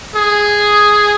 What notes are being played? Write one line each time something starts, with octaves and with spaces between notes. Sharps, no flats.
G#4